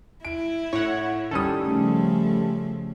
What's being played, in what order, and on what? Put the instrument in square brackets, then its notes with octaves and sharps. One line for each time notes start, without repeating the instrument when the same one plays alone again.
[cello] E4 [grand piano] D7
[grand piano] A2 [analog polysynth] C#5 F#5
[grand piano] D#3 D#6 [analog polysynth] G3 C#4 A4
[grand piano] C#3 [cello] F3 A3